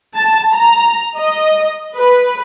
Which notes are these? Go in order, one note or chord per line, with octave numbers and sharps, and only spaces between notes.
A5
A#5
D#5
B4